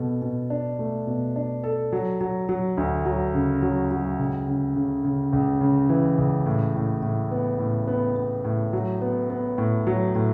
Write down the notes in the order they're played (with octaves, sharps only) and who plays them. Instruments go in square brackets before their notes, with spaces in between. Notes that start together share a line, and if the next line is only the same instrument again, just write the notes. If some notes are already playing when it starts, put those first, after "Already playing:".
Already playing: [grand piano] B2 A4
B2
D4
A3
B2
D4
A4
F#3
F#3
F#3
D2
F#3
C#3
F#3
F#3
C#2
C#3
C#3
C#3
C#2
C#3
E3
C#2
A2
A2
A2
B3
A2
B3
B3
A2
F#3
B3
B3
A2
F#3
A2